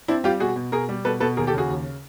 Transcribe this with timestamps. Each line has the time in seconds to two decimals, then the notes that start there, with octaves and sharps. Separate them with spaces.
0.08 C4 D4 E4
0.24 G3 F4 G4
0.40 B2 F#4 G#4
0.56 B2
0.72 B2 G#4 A#4
0.89 G3
1.05 B2 A4 B4
1.20 B2 A4 B4
1.37 D#2 G#4 A#4
1.47 G4 A4
1.53 C#3 F#4 G#4
1.69 D#2